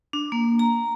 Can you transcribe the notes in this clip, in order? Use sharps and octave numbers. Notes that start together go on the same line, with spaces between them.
D4
A#3
A#5